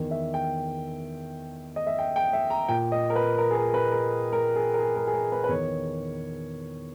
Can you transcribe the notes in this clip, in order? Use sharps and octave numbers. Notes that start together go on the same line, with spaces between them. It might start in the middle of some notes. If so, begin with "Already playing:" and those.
Already playing: E2 D#3
E5
G5
D#5
E5
G5
G5
E5
A#5
A#2 G5
D#5
A#4
B4
A#4
G#4
A#4
B4
A#4
A#4
G#4
A#4
G#4
A#4
G#4
A#4
B4
B4
E2 D#3 C#5